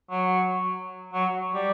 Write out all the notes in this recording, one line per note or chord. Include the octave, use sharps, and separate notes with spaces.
F#3
F#3
G3